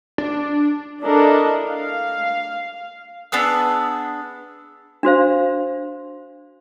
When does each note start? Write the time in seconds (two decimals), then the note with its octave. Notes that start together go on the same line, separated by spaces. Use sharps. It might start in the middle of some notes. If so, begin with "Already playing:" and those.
0.18 D4
1.01 D4 E4 A4 A#4 D#5
1.68 F5
3.32 B3 D4 G#4 E6
5.03 D4 F#4 C5 F5